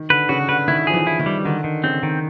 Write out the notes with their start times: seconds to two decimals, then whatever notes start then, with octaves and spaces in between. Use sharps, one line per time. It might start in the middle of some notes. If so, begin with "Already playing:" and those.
Already playing: D#3
0.10 D3 B4
0.29 C#3 F#4
0.49 D3 B4
0.68 D#3 E4
0.87 F3 G#4
0.94 E3
1.07 E4
1.19 D#3
1.26 G3
1.45 D3 D#3
1.64 D#3
1.84 C#3 C4
2.03 D#3